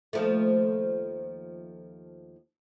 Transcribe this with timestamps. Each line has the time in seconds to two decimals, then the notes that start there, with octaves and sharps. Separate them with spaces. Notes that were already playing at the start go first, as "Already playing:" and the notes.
0.13 D#2 F3 A3